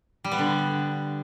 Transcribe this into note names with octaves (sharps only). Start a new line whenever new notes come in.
G3
B3
D3